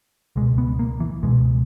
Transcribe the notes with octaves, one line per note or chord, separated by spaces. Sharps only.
C#2 B2 G#3
B3
A#3
E3
C#2 B2 G#3